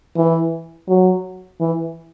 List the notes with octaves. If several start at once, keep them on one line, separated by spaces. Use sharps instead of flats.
E3
F#3
E3